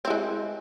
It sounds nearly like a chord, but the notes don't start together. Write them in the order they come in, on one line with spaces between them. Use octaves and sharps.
C4 E4 G#3